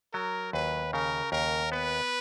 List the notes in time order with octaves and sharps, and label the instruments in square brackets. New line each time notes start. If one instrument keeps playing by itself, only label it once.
[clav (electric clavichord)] F#3 [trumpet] A#4
[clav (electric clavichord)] D#2 [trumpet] B4
[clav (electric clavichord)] C#3 [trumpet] A#4
[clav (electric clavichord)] D#2 [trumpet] A#4
[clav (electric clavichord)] B3 [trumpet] B4